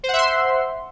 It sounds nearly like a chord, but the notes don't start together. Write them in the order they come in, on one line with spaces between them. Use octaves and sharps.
C5 F#5 E5 C6